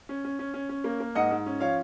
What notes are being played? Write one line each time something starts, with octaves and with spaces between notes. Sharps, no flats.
C#4
C#4
C#4
C#4
C#4
A#3
A#3
G#2 D#5 F#5
G#2
C#4
F3 C#5 F5